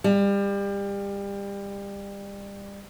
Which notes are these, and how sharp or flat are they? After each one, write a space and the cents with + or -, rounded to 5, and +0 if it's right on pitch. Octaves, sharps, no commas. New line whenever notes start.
G3 +30